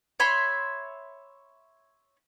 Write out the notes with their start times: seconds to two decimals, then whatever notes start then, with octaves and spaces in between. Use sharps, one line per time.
0.20 C#5 E5 B5 C6